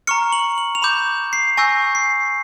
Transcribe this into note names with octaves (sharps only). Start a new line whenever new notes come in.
A#5 C#6 F6 C#7
F#7
F#7
F7
B5 D6 G6 E7
C7
G#5 C#6 E6 G6 A#6
C7